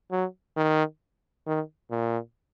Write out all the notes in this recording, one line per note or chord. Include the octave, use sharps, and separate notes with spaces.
F#3
D#3
D#3
A#2